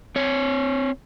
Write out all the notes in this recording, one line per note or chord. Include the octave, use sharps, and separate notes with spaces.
C4 C#5